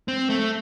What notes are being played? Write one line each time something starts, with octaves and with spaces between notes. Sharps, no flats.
C4
A3